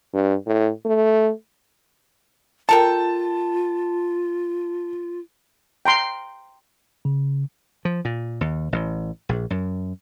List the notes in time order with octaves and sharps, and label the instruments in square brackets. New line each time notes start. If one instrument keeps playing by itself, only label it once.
[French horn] G2
A2
A3
[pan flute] F4 [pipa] A4 A#4 G5 [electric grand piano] A5
[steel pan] G5 A#5 C6
[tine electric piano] C#3
[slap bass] F3
A#2
D#2
A1
A#1
F#2